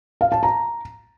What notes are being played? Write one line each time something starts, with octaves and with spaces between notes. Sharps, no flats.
F5
A5
A#5